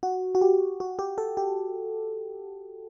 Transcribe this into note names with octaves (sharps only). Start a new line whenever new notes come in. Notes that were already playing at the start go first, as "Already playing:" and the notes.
F#4
F#4
G4
F#4
G4
A4
G4